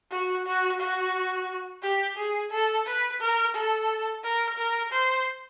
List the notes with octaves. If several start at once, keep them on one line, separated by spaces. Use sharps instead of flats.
F#4
F#4
F#4
G4
G#4
A4
B4
A#4
A4
A#4
A#4
C5